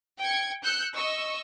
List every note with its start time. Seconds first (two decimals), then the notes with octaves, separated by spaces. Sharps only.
0.20 G5 G#6 C#7
0.63 E6 F#6 G6 C#7
0.96 D#5 C#6 E6